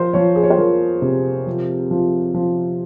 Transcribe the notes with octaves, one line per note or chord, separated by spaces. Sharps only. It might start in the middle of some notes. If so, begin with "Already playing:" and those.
Already playing: F3 A#4 C5
F3 C#5
G#4
C#5
C5
F3 A#4
C3
F3
F3
F3